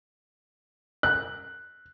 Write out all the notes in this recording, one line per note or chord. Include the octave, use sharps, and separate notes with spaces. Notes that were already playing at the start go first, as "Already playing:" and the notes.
F#6